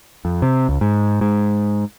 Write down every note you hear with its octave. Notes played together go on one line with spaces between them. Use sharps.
F2
C3
C#2
G#2
G#2